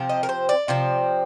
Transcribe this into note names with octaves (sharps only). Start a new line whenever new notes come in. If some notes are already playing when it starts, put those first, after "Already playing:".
Already playing: C3 F3 C4
D#5
A#4
C5
D5
C3 F3 C4